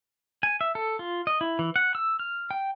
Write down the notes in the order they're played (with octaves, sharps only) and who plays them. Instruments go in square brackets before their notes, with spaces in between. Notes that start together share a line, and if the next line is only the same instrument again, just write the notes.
[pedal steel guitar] G#5
E5
A4
F4
D#5
E4
E3
F#5
E6
F6
G5